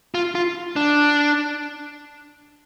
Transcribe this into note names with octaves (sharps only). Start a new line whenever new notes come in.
F4
F4
D4